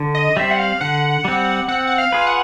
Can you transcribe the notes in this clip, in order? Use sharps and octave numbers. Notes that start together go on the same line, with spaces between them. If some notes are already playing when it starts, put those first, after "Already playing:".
Already playing: D3
D#5
G3 C4 E5
F#5
F5
D3 F#5
G3 C4
C4 F#5
F#5
F5
F4 G#4 B4
F#5